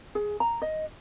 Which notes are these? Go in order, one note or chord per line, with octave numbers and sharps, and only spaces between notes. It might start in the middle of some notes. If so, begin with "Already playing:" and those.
G#4
A#5
D#5